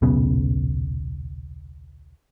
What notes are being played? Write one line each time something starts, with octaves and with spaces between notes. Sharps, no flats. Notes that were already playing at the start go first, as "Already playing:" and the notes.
D#1 B1 C#3 B3